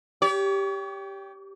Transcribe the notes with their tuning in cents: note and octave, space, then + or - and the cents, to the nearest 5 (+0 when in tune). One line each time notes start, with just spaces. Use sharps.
G4 +0 C#5 +40